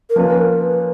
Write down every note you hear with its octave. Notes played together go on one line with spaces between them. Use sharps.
A#4
F3 A#3 C#4 F4 B4
A#4
B4